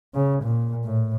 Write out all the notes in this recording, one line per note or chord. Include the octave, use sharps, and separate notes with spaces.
C#3
A#2
A2